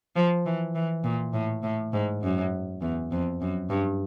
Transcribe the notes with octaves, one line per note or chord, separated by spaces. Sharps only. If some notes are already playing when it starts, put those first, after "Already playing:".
F3
E3
E3
A#2
A2
A2
G#2
F#2
E2
F2
F#2
G2